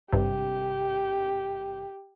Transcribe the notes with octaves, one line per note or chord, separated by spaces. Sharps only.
G#1 G2 C3 G4